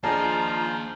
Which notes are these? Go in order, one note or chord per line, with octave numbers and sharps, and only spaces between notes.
F3 A#3 D4 F4 G#4 D#5 A5 A#5